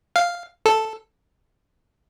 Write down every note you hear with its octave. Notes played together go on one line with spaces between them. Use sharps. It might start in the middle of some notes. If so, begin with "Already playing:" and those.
F5
A4